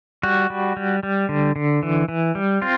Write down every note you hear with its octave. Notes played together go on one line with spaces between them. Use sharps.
G3 F#4
G3
G3
G3
D3
D3
E3
E3
G3
C4 F4